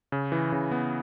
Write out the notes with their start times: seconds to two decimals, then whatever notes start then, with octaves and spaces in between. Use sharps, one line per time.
0.12 C#3
0.32 E3
0.52 C#3
0.71 B3